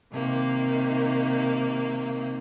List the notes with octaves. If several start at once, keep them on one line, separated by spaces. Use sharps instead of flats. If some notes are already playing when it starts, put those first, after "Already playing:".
C3 D#3 A#3